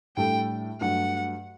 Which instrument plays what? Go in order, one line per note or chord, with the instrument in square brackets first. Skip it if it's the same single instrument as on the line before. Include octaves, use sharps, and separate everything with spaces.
[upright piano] A2 G3 D4 A4 [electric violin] G5
[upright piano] G2 F#3 A3 D4 [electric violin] F#5